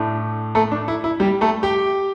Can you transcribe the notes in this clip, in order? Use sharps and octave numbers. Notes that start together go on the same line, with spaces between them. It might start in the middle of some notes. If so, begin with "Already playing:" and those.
Already playing: A2 A3 D4
A3 A4
D4
E4
E4
G3 G4
A3 A4
G4 G5